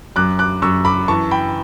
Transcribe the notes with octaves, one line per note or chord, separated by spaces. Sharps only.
F#2 D6 F#6
D6 F#6
F#2 C#6 E6
B5 D6
E3 A5 C#6
G5 B5